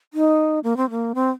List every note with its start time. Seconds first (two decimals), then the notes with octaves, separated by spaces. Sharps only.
0.14 D#4
0.64 A#3
0.77 C4
0.90 A#3
1.15 C4